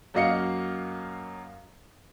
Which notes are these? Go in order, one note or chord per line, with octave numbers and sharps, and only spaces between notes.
F#2 A#3 F#4 D#5 F5 C#7